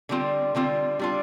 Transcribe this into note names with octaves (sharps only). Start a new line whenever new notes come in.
D3 G3 C4 F4
D3 G3 C4 F4
G3 D4 F4